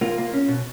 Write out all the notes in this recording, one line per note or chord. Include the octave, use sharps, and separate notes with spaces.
A#3 F4
A#3
C#4
B2